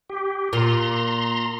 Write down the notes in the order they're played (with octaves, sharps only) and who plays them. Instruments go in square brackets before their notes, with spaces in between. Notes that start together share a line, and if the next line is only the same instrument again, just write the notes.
[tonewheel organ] G4
[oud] A#2 [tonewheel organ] A#5 C6